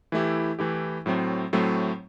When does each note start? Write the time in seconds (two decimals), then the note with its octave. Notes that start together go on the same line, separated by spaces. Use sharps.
0.12 E3 A3 E4 G4
0.59 E3 A3 E4 G4
1.06 A2 F#3 A3 C4
1.53 A2 F#3 A3 C4